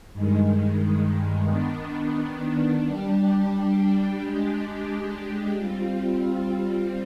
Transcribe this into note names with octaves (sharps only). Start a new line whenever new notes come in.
G2 D#3 G#3
D#3 B3 D4
G3 D4 G4
G#3 D4 G4
G3 C4 F4